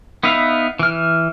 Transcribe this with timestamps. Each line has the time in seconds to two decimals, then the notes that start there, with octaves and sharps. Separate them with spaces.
0.23 B3 D#4 B4 E5 F5
0.79 E3 F6